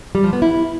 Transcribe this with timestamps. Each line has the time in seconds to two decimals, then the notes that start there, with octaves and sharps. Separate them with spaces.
0.15 G3
0.24 F3
0.33 B3
0.42 E4